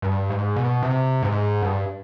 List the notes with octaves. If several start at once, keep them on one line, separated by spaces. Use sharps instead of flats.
G2
G#2
B2
C3
G#2
G2